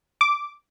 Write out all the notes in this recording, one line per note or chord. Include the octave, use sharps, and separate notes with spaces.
D6